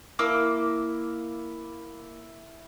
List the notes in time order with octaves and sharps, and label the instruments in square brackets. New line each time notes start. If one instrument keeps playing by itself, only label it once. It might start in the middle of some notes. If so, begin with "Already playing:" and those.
[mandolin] A#3 D6 E6 [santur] E4